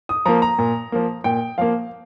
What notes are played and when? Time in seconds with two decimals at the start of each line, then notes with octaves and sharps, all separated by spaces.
0.09 D#6
0.26 F3 A#3 A#5
0.42 A#5
0.59 A#2
0.92 F3 A#3
1.24 A#2 G5
1.58 F3 A#3 F5